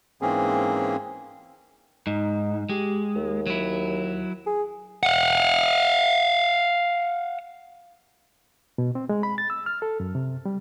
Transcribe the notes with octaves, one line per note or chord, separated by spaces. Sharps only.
G#2 E3 A#3 C4 C#4 G#4
G#2 D#4
G#3 G4
D#2
F#3 E4
G#4
F5 F#5
B2
C4
G#3
B5
A6
E6
F6
A4
F#2
C3
G3